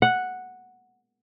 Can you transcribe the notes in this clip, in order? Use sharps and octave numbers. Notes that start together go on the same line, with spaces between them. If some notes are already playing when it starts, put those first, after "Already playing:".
F#5